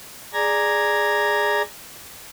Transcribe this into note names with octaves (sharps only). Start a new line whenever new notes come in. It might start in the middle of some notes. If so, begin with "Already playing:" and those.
G#4 D5 A#5 G#6 A#6